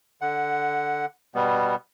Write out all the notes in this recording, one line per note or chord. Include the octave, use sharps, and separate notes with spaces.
D3 F#5
B2 G3 B3